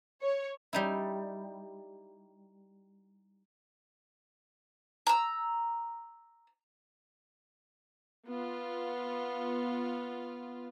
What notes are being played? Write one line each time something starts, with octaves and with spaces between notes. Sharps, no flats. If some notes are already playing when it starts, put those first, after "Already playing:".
C#5
G3 D#4 E4
A#5 E6
B3 F4